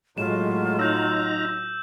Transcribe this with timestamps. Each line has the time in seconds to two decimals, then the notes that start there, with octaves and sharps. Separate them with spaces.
0.18 A2 F#3 G#3 F4 E7
0.79 D#4 A#5 E6 G6